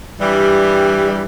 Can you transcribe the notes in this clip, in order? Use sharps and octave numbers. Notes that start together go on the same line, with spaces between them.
G2 E3 G3